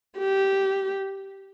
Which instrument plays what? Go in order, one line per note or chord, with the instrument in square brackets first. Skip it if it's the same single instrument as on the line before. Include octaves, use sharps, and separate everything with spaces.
[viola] G4